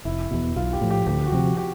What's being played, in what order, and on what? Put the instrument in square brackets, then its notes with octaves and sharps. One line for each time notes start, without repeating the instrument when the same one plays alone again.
[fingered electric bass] F1 [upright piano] E4
[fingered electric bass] E2 B2
[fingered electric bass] B1 [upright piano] F4
[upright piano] G4
[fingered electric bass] A2 F3
[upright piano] G4
[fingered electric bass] D2 [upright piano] G4
[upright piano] F#4
[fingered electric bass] C3 F3 [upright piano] G4
[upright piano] G4